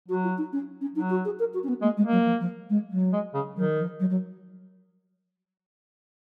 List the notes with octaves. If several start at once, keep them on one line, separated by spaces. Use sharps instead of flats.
F#3 F#4
F4
D#4
C#4
C#4
F#3 D#4
F#4
G#4
A#4
F#4
C#4
B3
G#3 A#3
G#3
A#3
F#3
F3
F3
G#3
F#3
G#3
C#3
D#3 F#3
F3
F#3
F#3